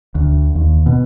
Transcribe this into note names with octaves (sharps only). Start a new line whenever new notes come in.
D2
D#2
B2